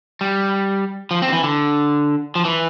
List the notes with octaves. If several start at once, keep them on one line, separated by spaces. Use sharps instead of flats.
G3
F3
C4
D3
E3
D3
F3
E3